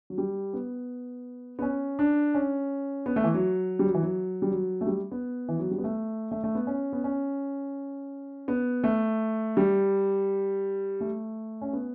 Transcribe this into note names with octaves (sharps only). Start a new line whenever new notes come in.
F#3
G3
B3
B3
C#4
D4
C#4
B3
A3
E3
F#3
G3
F#3
E3
F#3
G3
F#3
A3
G3
B3
E3
F#3
G3
B3
A3
A3
A3
B3
C#4
B3
C#4
B3
A3
G3
A3
C#4
B3